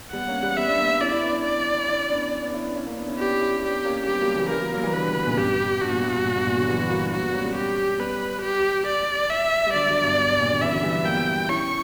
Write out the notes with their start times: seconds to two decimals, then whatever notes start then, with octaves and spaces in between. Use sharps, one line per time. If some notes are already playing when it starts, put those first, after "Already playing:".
0.13 G3 B3 F#5
0.28 A#3 C#4
0.42 G3 B3
0.57 G3 B3 E5
0.68 B3 D4
0.79 A#3 C#4
0.89 B3 D4
1.01 C#4 E4 D5
1.11 C#4 E4
1.23 B3 D4
1.33 B3 D4
1.44 D5
1.88 C#4 E4
2.00 C#4
2.10 B3 D4
2.42 B3 D4
2.54 C#4 E4
2.64 B3 D4
2.76 C#4 E4
2.86 A#3 C#4
2.97 B3 D4
3.08 C#4 E4
3.19 B3 D4 G4
3.41 C#4 E4
3.63 B3 D4 G4
3.84 A#3 C#4
4.06 G3 B3 G4
4.21 F#3 A#3
4.36 C#3 E3
4.50 E3 G3 A#4
4.61 F#3 A#3
4.72 F#3 A#3
4.83 E3 G3
4.93 D3 F#3 B4
5.05 B2 D3
5.16 B2 D3
5.26 A#2 C#3
5.37 G2 B2 G4
5.81 G2 B2 F#4
5.92 A#2
6.03 G2
6.14 G2
6.24 A#2
6.35 G2 B2
6.47 A#2
6.57 D3 F#3
6.68 E3 G3
6.79 E3 G3
6.90 F#3 A#3
7.01 B3 D4
7.12 F#3 A#3 F#4
7.23 G3 B3
7.34 A#3 C#4
7.45 G3 B3
7.56 G4
7.99 G3 B3 B4
8.43 G4
8.87 D5
9.30 E5
9.66 G3
9.74 D3 F#3 D5
9.89 D3 F#3
10.03 G2 B2
10.29 G2
10.40 A#2
10.50 B2 D3
10.61 C#3 E3 E5
10.72 D3 F#3
10.83 E3 G3
10.94 B3
11.04 A#3 G5
11.14 G3 B3
11.49 C#4 E4 C#6